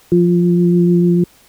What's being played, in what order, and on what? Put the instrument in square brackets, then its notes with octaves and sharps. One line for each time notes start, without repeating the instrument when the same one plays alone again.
[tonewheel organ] F3